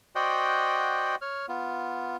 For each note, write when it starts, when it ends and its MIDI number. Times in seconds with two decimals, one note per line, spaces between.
0.15 1.15 66
0.15 1.15 72
0.15 1.15 74
0.15 1.15 75
0.15 1.15 78
0.15 1.15 79
1.22 1.46 73
1.22 1.46 89
1.49 2.17 59
1.49 2.17 65